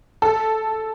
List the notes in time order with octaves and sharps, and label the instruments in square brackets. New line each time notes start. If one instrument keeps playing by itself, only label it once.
[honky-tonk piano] A4